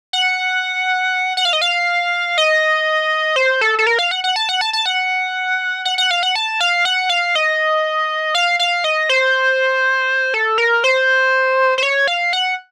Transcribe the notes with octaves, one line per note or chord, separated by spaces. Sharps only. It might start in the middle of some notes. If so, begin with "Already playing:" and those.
F#5
F#5
F5
D#5
F5
D#5
C5
A4
A4
A#4
F5
F#5
F#5
A5
F#5
A5
A5
F#5
F#5
F#5
F5
F#5
A5
F5
F#5
F5
D#5
F5
F5
D#5
C5
A4
A#4
C5
C5
C#5
F5
F#5